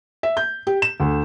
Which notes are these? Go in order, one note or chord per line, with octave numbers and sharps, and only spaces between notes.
E5
G6
G4
E7
D2